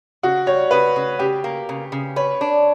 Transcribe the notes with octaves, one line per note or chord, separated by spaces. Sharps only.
C#3 F#4
G3 C#5
C#3 B4
C#3
C#3 G4
A#3
C#3
C#3
B4 C#5
D4